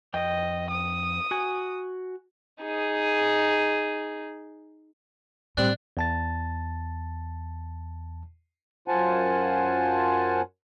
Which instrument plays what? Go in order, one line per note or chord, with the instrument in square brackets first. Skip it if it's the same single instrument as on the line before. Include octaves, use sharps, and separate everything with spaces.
[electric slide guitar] F2 G5 [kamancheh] D#5
[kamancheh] D#6
[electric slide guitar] F#4 G#5
[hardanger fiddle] D#4 G#4
[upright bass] A2 [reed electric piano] G3 C4 F#6 [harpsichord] D4
[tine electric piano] E2 A5 A6
[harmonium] F#2 F4 C5 F#5 G#5 A5